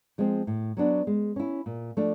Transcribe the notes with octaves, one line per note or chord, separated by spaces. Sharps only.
F3 G#3 C4
A2
F#3 B3 D4
G#3
C#4 E4
A#2
F3 A3 D4